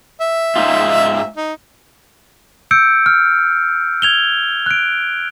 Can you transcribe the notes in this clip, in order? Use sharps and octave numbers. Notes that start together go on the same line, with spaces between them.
E5
G#2 D#4 F4
D#4
E6 G6 C#7 D7
F6
G#6 F7 G7
F#6 D7